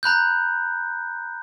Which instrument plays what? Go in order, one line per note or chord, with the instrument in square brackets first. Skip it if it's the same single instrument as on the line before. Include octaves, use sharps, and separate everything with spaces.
[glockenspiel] A#5 B5 F#6 G6